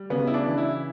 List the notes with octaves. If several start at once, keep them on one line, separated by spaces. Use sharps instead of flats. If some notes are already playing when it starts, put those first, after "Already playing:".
Already playing: G3
C#3 B3
E4
D4
E3
E4